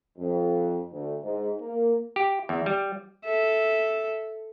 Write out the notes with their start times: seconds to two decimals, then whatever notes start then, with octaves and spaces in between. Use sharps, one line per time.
0.18 F2
0.92 D2
1.22 G#2
1.61 A#3
2.16 G4
2.49 E2
2.66 G3
3.25 A4 E5